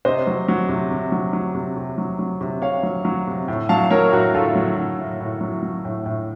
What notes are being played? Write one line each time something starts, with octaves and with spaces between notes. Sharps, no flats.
C3 C5 D#5
F#3
F#3
C3
C3
F#3
F#3
C3
C3
F#3
F#3
C3
C3 C#5 F5
F#3
F#3
C3
A2
F#3 F5 A5
F#3 A#4 C#5
A2 F#4
A2 F4 A4
F#3
F#3
A2
A2
F#3
F#3
A2
A2